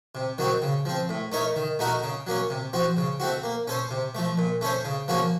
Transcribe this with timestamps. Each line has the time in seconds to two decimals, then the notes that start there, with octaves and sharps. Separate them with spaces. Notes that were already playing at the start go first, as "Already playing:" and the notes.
0.15 C3
0.38 D#3 F#3 C4 F#4
0.62 C#3
0.85 F3 C4
1.09 A2
1.32 A3 D#4 A#4 C#5
1.56 D#3
1.79 A3 D#4 F#4 A#4
2.03 C#3
2.27 F#3 A#3 C#4
2.50 C3
2.73 F3 C4 F#4
2.97 C#3
3.20 A3 C4 F#4
3.43 A#3
3.67 C#4 A4 C5
3.91 C3
4.15 F3 A3
4.38 A#2
4.61 A3 C#4 A4 C5
4.85 C#3
5.08 F3 A#3 C#4 F#4